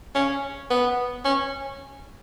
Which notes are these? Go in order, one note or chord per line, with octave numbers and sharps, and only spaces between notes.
C#4
B3
C#4